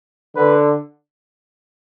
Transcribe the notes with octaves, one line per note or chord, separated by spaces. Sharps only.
D3 B4